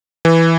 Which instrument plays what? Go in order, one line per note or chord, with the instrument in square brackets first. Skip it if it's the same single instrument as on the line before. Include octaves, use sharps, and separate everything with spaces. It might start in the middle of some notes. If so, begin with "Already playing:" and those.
[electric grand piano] E3